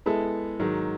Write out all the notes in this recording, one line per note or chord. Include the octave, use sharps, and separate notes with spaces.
G#3 B3 E4 A4
G#2 D#3 F#3